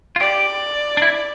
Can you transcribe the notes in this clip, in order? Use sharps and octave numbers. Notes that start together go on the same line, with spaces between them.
F4
G4 D5
D4
E4